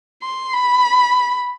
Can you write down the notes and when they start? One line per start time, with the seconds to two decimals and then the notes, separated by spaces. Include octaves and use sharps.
0.23 C6
0.53 B5